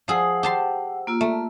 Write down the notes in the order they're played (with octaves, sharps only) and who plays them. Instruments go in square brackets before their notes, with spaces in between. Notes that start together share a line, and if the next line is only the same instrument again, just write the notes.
[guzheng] F3 G#4 [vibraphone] C5 F#5 E6
[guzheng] G4 A5 C6
[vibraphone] A#3 F4 E6
[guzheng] A3